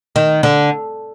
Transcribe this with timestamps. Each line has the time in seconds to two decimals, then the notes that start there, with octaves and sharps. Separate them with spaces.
0.16 D#3
0.43 D3